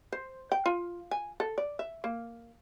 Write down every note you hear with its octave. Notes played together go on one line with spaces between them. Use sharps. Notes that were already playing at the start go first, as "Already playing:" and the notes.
C5
G5
F4
G#5
A4
D5
E5
A#3